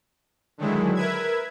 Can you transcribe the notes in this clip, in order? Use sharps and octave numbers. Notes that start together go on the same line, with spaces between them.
D3 D#3 F#3 G#3 E4
A#4 B4 E5 G#6